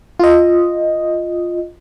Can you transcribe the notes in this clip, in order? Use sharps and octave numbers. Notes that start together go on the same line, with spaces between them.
F4 D#5